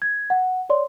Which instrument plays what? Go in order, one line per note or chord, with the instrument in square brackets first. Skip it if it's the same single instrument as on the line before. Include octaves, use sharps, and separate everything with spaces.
[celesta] G#6
F#5
C#5 D5 C6